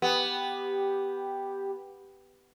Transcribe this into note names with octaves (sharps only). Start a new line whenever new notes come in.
B3 G4